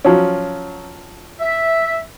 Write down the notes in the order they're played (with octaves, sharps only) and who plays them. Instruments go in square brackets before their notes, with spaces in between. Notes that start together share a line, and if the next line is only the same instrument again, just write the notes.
[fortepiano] F3 F#3 C#4
[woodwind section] E5